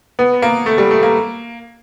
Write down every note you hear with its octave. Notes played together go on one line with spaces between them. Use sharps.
B3
A#3
A3
G3
A3
A#3